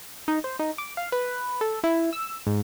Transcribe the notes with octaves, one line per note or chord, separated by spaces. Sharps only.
D#4
C5
D#4
D6
F5
B4
A4
E4
E6
G#2